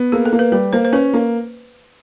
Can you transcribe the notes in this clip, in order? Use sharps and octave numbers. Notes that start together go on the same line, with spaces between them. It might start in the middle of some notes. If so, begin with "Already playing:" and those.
Already playing: B3
A#3 G#4
A4
A#3
B4
G3 B4
A#3 C5
C5
C#4 B4
A#3